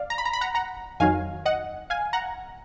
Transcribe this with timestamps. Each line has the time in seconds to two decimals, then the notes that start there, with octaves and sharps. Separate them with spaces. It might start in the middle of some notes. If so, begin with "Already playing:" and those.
Already playing: D5 F5
0.10 A#5
0.18 B5
0.25 A#5
0.33 B5
0.41 F#5 A#5
0.55 F#5 A#5
1.00 F2 D#3 F#3 F5 G#5
1.45 D#5 F#5
1.90 F5 G#5
2.13 F#5 A#5